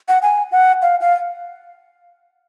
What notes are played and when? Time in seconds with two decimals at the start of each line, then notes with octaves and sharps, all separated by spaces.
0.08 F#5
0.22 G#5
0.52 F#5
0.82 F5
1.01 F5